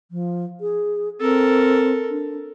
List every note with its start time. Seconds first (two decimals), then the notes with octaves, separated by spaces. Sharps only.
0.11 F3
0.61 G#4
1.21 C4 A4 A#4
2.10 D4